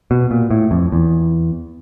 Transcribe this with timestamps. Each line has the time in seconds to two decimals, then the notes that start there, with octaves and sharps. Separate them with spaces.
0.11 B2
0.31 A#2
0.50 A2
0.71 F2
0.92 E2